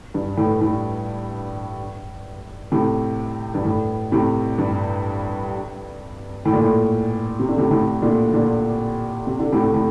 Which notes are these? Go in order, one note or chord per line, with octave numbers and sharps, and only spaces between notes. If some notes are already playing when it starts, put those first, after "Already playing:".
G2
A2
A2
A2 C3
G2
A2
A2 C3
G2
A2
A#2
A2
C3
D3
A2 C3
A2 C3
A#2 D3
A#2 D3
C3
D3
A2 C3
A2